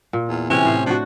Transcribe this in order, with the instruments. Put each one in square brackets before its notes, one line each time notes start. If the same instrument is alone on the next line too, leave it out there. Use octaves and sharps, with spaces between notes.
[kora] A#2
[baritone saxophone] E2
[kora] C3 E3 G#4 [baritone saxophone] C#4
[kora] A2 C5 F5
[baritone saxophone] F3 [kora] D4 F#4